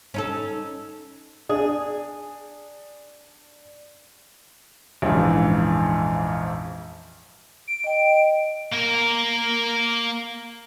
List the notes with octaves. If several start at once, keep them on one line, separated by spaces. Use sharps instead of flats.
C#4 D#4 A4
D4 G#4 D5
A#1 F2 G#2 C#3 E3
D7
D#5 G5
A#3 A#4